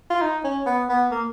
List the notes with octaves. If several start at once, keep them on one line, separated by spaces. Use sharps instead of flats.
F4
D#4
C#4
B3
B3
A#3